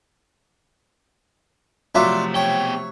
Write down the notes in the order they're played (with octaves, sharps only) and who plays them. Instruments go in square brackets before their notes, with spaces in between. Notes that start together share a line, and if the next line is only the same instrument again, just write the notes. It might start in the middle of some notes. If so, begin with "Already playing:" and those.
[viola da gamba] C3 F3 A3 [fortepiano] F#3 E5 [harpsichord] D4 F4 D5
[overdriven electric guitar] B2 G5 [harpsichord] C#5